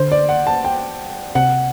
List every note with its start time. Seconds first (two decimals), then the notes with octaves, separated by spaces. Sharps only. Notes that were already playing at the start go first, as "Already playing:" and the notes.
Already playing: D3 C5
0.12 D5
0.29 F#5
0.47 A5
0.65 G5
1.35 C3 F#5